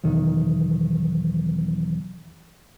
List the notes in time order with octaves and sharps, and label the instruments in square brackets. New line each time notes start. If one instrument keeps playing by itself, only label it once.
[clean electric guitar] B1 E2 D#3